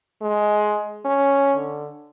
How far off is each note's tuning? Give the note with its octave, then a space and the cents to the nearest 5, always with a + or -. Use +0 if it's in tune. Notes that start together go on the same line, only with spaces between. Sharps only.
G#3 +15
C#4 +0
D3 +10